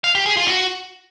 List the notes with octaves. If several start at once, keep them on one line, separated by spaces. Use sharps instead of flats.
F5
G4
G#4
F4
F#4